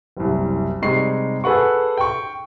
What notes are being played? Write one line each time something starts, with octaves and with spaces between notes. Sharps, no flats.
F#1 C2
C3 G3 G#3 D#4 C#6 C7
G#4 A4 B4 F#5 C#6
G5 C#6